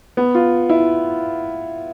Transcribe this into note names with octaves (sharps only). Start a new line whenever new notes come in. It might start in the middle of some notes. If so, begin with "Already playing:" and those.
B3
F4
E4